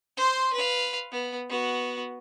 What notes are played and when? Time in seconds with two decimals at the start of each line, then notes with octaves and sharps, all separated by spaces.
0.17 C5 C6
0.53 B4 F5
1.12 B3
1.49 B3 F#4